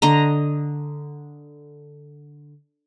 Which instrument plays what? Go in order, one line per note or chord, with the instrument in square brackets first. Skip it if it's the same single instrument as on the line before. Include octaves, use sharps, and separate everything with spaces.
[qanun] D3 D#5 A#5